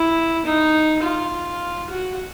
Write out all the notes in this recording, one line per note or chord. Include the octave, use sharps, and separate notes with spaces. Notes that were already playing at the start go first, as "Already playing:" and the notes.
Already playing: E4
D#4
F4
F#4